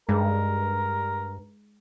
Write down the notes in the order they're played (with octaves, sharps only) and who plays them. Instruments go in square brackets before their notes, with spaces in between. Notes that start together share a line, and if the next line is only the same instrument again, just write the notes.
[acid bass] G2 [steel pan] G#3 [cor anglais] A#4